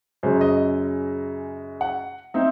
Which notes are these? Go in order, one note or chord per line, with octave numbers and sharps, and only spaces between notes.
F#2 C#3 G#3 C5
D#5
F#5
C4 D#4 E5